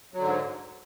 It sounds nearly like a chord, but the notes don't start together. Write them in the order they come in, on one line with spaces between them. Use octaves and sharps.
F#3 D3 G#2